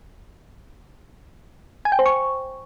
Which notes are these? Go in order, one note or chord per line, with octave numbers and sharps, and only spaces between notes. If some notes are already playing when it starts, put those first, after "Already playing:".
G#5
G5
C5
C#6